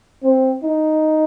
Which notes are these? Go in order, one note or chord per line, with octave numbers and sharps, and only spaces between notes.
C4
D#4